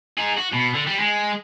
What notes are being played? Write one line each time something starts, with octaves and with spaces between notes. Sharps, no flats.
D#4 G#4
F#4
B2
D3
G3
G#3